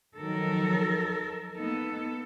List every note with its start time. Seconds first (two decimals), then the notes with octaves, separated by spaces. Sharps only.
0.17 D#3 F3 F#3 A4 A#4
1.55 A#3 B3 D#4 A4